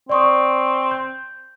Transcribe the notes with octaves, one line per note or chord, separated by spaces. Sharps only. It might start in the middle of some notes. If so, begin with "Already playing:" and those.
C4 D5 C#6 D#6
G6